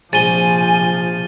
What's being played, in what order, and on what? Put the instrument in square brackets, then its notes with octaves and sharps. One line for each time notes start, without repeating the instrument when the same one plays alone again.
[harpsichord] A#1 [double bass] C3 F3 [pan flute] G#5 [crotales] A6 D#7 G7